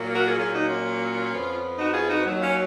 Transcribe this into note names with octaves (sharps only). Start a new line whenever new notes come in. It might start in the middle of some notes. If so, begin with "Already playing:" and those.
Already playing: A#2 F#3 A#3
F#4 A#4
F4 G#4
A#2 F#3 A#3 F4 G#4
D#4 F#4
C#4 F4
F2 F3 B3
D#4 F#4
F4 G#4
D#4 F#4
D#2 D#3 F#3
C#4 F4